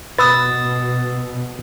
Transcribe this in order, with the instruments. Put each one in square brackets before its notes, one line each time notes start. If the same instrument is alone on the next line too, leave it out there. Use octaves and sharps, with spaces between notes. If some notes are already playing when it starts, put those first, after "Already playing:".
[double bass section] B2 [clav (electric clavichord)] B4 [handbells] D#6 E6 A6